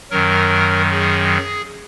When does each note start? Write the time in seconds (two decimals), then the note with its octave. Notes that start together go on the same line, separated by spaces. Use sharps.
0.11 F#2 D#3 F#3 A#4
0.91 G#4